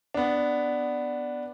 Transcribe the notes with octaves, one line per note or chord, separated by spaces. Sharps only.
B3 D4